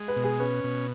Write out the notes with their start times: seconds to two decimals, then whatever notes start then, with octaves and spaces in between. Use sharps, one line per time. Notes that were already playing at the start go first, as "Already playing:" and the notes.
Already playing: G#3
0.08 B4
0.16 B2
0.24 G#4
0.40 C#4 B4
0.64 B2